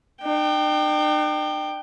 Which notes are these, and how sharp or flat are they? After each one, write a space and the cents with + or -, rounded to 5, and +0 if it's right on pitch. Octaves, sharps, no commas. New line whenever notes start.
D4 +45 G5 +0